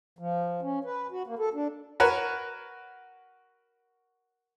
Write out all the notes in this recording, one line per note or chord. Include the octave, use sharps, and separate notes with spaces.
F3
C#4
B4
F#4
A#3
A4
D4
F#4 A#4 B4 C#5